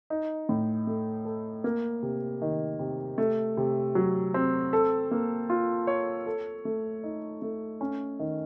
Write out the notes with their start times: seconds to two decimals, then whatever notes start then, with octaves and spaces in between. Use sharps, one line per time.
0.10 D#4
0.49 A2
0.87 A3
1.25 A4
1.64 A#3
2.02 C3
2.42 D#3
2.79 C3
3.18 A3
3.57 C3
3.95 F#3
4.34 C4
4.73 A4
5.11 A#3
5.50 F4
5.87 C#5
6.26 A4
6.65 A3
7.04 D#4
7.42 A3
7.81 C#4
8.19 D#3